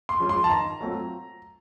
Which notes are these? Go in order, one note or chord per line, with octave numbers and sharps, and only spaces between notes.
C6
F3 G#3 C#4
C6
A5
D#3 A#5
F#3 A3 C4 F4